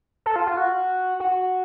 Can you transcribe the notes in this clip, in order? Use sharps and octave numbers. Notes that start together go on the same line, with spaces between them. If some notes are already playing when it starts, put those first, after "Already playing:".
A4
F4
F4
F#4
F#4